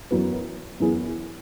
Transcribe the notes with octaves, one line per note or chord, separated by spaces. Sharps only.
F#2 E3 B3 F#4 B4
F#2 E3 B3 E4 G#4